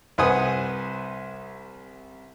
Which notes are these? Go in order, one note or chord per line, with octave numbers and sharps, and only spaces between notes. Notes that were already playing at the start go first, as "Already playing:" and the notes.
C2 B4 C5 F#5 G#5 D#6